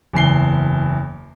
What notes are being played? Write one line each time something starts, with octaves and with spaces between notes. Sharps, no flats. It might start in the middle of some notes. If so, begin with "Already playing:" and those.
F#1 E2 C7 G7